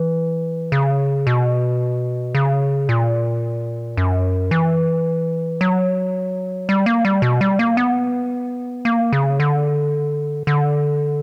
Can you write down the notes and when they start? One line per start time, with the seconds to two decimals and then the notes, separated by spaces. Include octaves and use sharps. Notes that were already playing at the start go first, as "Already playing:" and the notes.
Already playing: E3
0.72 C#3
1.27 B2
2.35 C#3
2.89 A#2
3.97 F#2
4.51 E3
5.61 F#3
6.69 G3
6.86 A#3
7.05 G3
7.22 B2
7.41 G3
7.59 A#3
7.77 B3
8.85 A#3
9.13 C#3
9.40 D3
10.47 D3